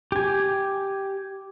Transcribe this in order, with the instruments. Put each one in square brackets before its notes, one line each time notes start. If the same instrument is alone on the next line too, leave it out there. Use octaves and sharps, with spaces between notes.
[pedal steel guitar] G4 G#5